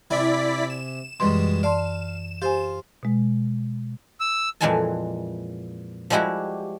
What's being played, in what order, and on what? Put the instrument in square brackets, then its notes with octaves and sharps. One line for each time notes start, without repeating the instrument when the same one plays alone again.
[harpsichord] C3 G#5 [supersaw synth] E4 D5 B6
[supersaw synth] E7
[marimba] F#2 E3 C6 [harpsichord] B2 G3 G#3
[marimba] D5 A5 C6 [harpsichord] F5
[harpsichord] F4 [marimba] G4 C5 G#5
[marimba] B2 G#3
[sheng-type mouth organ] E6
[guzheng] F2 A#2 E3 G#3 G#5 A5
F3 G3 G#3 E4 F#4 G4